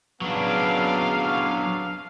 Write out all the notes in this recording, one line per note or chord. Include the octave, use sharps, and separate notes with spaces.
C#3 F#3 B3 D4 F5